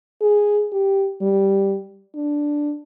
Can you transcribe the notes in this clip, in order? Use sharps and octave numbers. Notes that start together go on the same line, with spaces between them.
G#4
G4
G3
D4